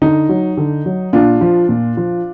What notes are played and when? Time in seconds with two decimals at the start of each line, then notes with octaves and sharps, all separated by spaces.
0.02 D3 D#4
0.29 F#3
0.57 D3
0.86 F#3
1.13 A#2 D4 F4
1.41 F3
1.69 A#2
1.97 F3